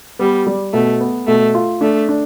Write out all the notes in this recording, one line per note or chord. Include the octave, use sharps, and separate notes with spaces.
G3 B3
G3
B2 A3
B3
B2 A3
F4
A3 D4
D4